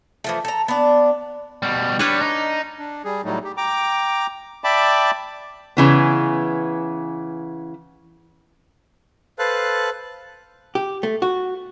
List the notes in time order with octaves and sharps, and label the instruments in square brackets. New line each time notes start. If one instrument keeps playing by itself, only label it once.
[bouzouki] E3 F3 A3
A4 A#5
B3 D4
[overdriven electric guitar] B2 G3
[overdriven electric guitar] G3 [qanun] D4 B4 C#5
[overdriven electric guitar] D#4
[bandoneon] D4
G3 G#4
A2 F#3 G3 A3 D#4
G4
G5 A#5 D6
D5 E5 G5 A5 B5 D6
[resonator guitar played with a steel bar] C#3 E3 B3
[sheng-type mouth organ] A4 B4 C5 F5 A5 F#6
[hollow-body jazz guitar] G4
A3
F#4